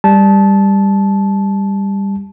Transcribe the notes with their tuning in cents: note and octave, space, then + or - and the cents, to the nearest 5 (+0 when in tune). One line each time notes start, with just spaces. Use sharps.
G3 +15 A5 -15